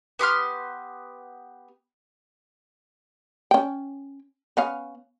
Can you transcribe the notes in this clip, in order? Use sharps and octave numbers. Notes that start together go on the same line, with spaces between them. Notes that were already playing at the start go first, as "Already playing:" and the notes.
B3 G4 C6 F6
C#4 G5
B3 C#4 F5